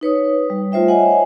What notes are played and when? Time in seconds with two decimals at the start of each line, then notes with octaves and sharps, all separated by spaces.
0.01 D#4 B4 C#5 D#6
0.50 G3
0.72 A3 F4 C5 E5 G5
0.88 C5 C#5 D#5 E5 F#5 G#5